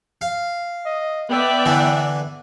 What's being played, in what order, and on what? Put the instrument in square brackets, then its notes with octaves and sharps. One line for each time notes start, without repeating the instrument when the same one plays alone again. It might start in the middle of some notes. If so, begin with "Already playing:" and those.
[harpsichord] F5
[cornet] D#5
[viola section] B3 D5 E5 [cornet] G5
[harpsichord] D3 E3